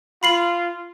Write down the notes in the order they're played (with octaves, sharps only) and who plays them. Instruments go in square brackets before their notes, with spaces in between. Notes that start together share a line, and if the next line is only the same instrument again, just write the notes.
[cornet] F4 [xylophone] B5 C7 F#7